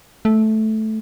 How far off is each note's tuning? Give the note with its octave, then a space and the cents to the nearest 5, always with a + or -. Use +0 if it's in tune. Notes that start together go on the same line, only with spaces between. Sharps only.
A3 -10